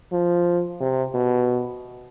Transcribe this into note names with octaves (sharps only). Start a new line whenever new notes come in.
F3
C3
B2